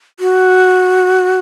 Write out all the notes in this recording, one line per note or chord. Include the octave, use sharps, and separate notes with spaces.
F#4